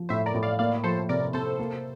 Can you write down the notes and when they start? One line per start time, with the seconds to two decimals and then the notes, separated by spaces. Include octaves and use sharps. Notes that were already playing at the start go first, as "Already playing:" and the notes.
Already playing: F3
0.09 A2 C5 E5
0.26 A#4 D5
0.34 A2
0.43 D5 F5
0.59 A#3 D5 F5
0.84 F3 A4 C5
1.09 C3 A#4 D5
1.33 C3 A4 C5
1.59 A#3